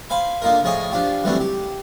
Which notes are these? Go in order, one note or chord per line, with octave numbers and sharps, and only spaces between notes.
C5 F5 G#5 B5
D3 A#3 D#4 F4 A#4
A2 F3 G#4 C#5 D#5 G#5
F3 D4 F4 G4
D3 E3 F#3 G3 A3 C4
G4